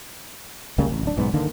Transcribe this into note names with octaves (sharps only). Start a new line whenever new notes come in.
C#2 C#3 G3 A#3
A1
D1 D4
B1 G#2 B3
D3 D#3 A#3